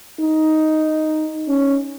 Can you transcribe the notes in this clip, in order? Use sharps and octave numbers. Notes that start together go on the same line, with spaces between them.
D#4
C#4